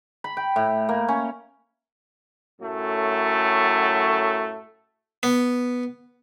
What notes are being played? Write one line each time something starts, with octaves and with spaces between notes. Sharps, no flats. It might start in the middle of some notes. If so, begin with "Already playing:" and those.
B5
G5
A2
A#3
C#4
F#2 A2 F#3 A3
B3